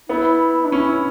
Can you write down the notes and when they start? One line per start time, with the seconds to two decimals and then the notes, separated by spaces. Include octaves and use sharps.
0.09 B3 E4
0.65 D4
0.71 C#4 E4
0.88 E4